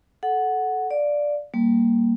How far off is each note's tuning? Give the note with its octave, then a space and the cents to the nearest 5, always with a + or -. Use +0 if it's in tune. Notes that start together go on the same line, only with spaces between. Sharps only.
A4 -20 F#5 +0
D5 +0 F5 +25
G3 +0 A#3 +0